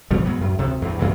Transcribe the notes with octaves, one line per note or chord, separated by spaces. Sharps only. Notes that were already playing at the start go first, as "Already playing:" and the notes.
B2 F3 G3 A3
D#2 G#2 F#3 B3
F#2
D2 C3 D#3
E2 G2
F#2 A#2 E3